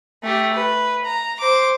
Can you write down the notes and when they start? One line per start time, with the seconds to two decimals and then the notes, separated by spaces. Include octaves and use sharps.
0.23 A3 G4
0.53 B4
1.05 A#5
1.40 C5 D6